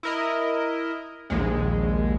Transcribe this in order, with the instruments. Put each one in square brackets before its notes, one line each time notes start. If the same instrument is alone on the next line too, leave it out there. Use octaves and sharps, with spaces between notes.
[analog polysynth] E4 A#4 D#5
A#1 D#2 G#3